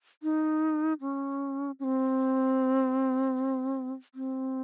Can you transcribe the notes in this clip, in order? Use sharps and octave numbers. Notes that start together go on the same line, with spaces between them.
D#4
C#4
C#4
C4
C4